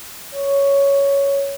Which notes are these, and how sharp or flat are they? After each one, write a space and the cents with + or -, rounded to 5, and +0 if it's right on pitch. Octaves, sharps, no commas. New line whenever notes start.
C#5 +5